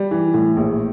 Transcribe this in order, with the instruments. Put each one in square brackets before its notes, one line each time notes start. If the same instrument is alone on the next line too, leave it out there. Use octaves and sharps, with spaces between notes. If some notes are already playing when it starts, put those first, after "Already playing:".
Already playing: [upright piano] G3
E3
A2
A#1